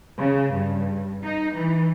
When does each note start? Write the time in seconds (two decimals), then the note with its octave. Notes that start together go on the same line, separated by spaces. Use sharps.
0.19 C#3
0.54 G2
1.22 D#4
1.54 E3